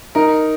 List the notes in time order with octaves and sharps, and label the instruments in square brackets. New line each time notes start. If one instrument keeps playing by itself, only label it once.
[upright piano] D#4 [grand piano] A#4